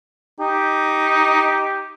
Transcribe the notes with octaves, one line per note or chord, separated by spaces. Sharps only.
D#4 G4